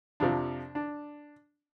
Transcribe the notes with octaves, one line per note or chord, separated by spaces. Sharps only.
F2 C3 F3 D4
D4